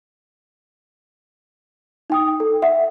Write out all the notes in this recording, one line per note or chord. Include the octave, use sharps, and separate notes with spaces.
D#4 G5 D#6
A4
E5 F#5